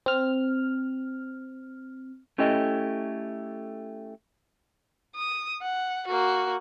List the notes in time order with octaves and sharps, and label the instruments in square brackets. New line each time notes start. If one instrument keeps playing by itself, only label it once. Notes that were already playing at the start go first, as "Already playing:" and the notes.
[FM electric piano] C4 F6
[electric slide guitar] A3 C#4 E4 G4 A4 D#5
[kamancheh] D#6
F#5
A#3 F#4